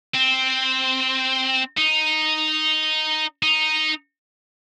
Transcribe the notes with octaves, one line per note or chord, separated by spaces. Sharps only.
C4
D#4
D#4